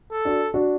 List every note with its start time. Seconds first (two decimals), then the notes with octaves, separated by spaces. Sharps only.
0.12 A4
0.25 D4 F#4
0.54 D4 F#4